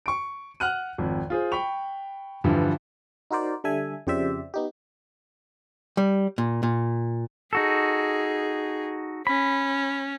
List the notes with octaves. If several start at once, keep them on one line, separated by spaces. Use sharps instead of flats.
C#6 D7
F#5 F6 F#6 D#7
G#1 F2
F4 G#4 C5
G5 B5 C#6 F7
G2 D3 E3 F3
D#4 F#4 A#4 C5 D5
D3 G3 A4 E5 G#5
F2 C#3 G4 C5 D5 E5
B3 D#4 G4
G3
A#2
A#2
D#4 F#4 G#4 A4
C#4 B5